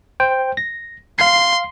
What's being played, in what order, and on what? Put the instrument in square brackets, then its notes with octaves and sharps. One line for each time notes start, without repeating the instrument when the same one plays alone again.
[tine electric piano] C5 G5
A#6
[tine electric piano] F5 C7 [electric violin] C6